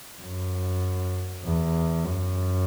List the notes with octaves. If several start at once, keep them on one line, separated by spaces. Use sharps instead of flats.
F#2
E2
F#2